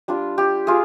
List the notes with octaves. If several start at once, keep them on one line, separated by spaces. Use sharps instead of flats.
G3 D4 F4
G4
F4 G#4